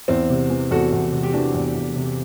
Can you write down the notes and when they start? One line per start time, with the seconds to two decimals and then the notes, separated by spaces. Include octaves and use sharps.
0.08 E2 C4 E4
0.30 C3
0.50 E3
0.71 E2 F#4 A4
0.92 E2
1.12 C3
1.23 G4
1.33 E3 D4 F#4
1.54 E2
1.76 E2
1.96 C3